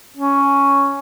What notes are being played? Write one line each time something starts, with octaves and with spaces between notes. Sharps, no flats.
C#4